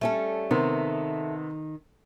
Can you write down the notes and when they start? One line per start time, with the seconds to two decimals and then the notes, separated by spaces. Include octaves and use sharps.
0.01 G3 A3 C#4 A4
0.51 C3 D#3 B3